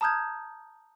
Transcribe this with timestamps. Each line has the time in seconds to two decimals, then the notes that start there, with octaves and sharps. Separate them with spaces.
0.01 A5 A#5 D#6 F6 G6 G#6